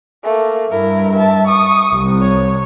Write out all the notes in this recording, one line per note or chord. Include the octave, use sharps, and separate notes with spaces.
A3 A#3
G2 E4 A#4
E5 A5
C#6 D#6
C2
C#5